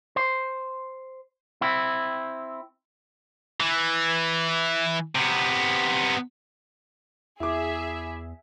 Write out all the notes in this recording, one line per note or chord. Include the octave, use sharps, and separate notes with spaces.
C5
C4 E4
E3
C3 B3
E2 E4 G#4 E5 D6